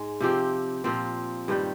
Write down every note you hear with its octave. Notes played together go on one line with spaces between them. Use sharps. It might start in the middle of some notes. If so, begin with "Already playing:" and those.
Already playing: G#2 G#3
C3 F3 C4 G4
A#2 F3 C4
G2 D#3 G3